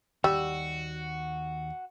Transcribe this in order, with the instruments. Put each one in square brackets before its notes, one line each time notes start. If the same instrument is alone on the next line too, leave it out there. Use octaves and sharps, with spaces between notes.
[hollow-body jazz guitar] D#2 [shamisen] G3 [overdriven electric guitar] F#4 [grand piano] E6